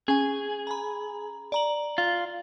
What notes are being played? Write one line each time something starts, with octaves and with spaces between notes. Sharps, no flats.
C#4 G#4 G#5
A#5 B5
D5 A#5 F#7
F4